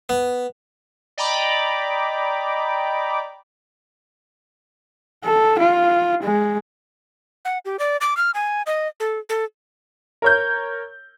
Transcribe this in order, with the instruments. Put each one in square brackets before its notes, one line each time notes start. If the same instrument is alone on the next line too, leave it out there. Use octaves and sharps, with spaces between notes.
[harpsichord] B3
[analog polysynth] D5 D#5 G5 A#5 B5 D6
[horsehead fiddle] A4
F4
G#3
[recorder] F#5
G4
D5
D6
F6
G#5
D#5
A4
A4
[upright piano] A#4 C#5 G6